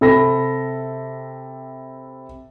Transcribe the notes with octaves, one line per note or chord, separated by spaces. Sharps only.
C3 A4 B5 A#6